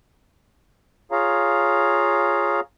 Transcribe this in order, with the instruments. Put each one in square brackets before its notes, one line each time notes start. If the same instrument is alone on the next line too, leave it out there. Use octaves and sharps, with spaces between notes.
[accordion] F4 G#4 C#5 F5 A#5